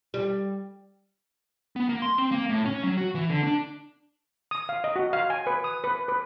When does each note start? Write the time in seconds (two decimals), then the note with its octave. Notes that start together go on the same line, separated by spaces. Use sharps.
0.14 G3
1.76 B3
1.89 A#3
2.02 C6
2.18 C4
2.32 A#3
2.49 A2
2.65 C#4
2.83 F#3
2.97 F#4
3.15 E3
3.29 D3
3.44 D4
4.51 D#6
4.69 F5
4.84 D#5
4.96 F#4
5.13 F5
5.30 G#5
5.47 B4
5.64 D#6
5.84 B4
6.08 B4